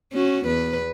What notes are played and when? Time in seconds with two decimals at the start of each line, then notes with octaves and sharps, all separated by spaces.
0.13 C#4 F#4
0.46 E2 B4